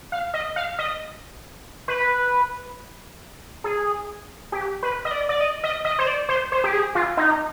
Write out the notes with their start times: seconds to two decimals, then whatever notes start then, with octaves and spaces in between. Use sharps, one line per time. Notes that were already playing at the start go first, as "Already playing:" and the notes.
0.12 F5
0.34 D#5
0.56 F5
0.79 D#5
1.88 B4
3.64 G#4
4.52 G4
4.83 B4
5.05 D#5
5.11 D5
5.29 D5
5.41 D#5
5.64 D#5
5.85 D#5
5.99 C5
6.07 D5
6.29 C5
6.52 C5
6.64 G4
6.73 G#4
6.95 F4
7.17 D#4